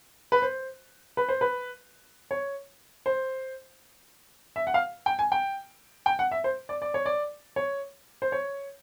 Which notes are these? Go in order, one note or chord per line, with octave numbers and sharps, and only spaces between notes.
B4
C5
B4
C5
B4
C#5
C5
E5
F#5
F5
G5
G#5
G5
G5
F#5
E5
C5
D5
D5
C#5
D5
C#5
C5
C#5